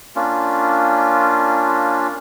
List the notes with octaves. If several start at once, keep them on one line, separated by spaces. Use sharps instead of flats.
A#3 C#4 D4 F4